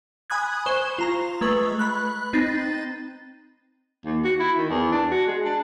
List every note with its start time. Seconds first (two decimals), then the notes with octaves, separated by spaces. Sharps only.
0.30 G#5 B5 D#6 F#6 G#6
0.66 C5 C#6 E7 G7
0.98 F4 A#5
1.41 G#3 A3 B4 C#6
1.79 B5 F#6
2.33 C4 D#4 A6
4.05 D#2
4.25 F#4
4.40 E4
4.58 D#3
4.70 E2
4.92 D4
5.12 F#4
5.27 G#3
5.45 D4